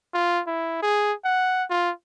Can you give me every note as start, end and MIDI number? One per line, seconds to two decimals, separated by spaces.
0.14 0.41 65
0.47 0.80 64
0.82 1.13 68
1.24 1.64 78
1.70 1.90 65